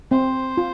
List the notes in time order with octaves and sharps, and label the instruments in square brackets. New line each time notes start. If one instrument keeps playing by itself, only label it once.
[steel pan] C4 [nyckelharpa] C5
[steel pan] F4